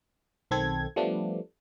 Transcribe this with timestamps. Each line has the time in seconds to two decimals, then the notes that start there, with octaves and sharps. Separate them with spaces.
0.51 B1 D#3 C4 A4 G#6
0.96 F3 G3 A3 B3 D4